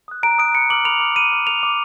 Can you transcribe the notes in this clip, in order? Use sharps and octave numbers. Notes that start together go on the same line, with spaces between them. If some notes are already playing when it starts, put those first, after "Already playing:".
D#6 F#6
A#5 D7
D#6 F#6 D7
B5 C#7
D6 F6 F#7
B5 F7
D6 F6
B5 D#7
D6 F6
B5 F7
D6 F6